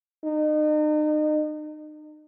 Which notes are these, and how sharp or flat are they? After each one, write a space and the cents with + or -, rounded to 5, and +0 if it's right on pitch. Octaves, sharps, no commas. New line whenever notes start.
D#4 -35